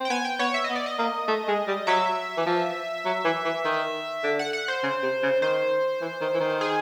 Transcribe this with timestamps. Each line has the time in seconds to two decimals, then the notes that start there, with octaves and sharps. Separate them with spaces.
0.01 C4
0.05 G5
0.10 B3 G#5
0.25 G5
0.39 B3 C#5
0.54 E5
0.64 D#5
0.69 B3
0.75 D5
0.86 D#5
0.99 A#3
1.28 A3
1.48 G#3
1.68 G3
1.87 F#3 E5
2.37 E3
2.47 F3
3.06 F#3
3.25 E3
3.45 E3
3.65 D#3
4.24 D3
4.39 F#5
4.53 F#5
4.68 C5
4.83 C#3
5.03 C3
5.23 C#3
5.42 D#3 C5
6.01 E3
6.21 D#3
6.34 E3
6.41 D#3
6.61 G#4